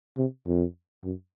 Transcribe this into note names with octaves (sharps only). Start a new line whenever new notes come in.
C3
F2
F#2